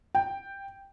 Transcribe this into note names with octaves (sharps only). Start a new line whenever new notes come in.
G5